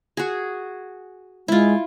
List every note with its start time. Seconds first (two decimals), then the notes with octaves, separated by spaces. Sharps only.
0.17 F#4 G#4
1.48 G#3 E4 F4